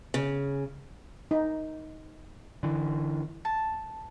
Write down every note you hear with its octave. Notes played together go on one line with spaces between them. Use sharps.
C#3
D#4
D3 E3
A5